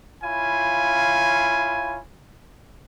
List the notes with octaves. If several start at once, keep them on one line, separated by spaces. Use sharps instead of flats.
E4 F4 C#5 F5 G#5 B5